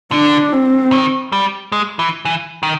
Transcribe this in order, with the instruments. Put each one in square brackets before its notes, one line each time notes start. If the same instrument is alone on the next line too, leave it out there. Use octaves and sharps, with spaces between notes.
[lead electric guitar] D3 [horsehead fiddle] D4
[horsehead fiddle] C4
[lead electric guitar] D#3
G3
G#3
E3
E3
D#3